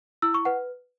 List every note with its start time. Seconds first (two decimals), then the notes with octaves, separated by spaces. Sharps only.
0.22 E4 E6
0.34 C#6
0.45 B4 F#5